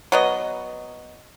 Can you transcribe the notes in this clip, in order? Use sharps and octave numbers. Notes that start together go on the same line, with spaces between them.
F#3 B3 D#5